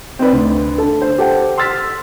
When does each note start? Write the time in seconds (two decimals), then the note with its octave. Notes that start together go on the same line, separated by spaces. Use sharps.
0.19 C4 D#4 B4 D5
0.33 D2
0.78 D3 A4
1.02 C5
1.18 G4 A4 C5 F#5 G5
1.58 C6 E6 F6 A6 B6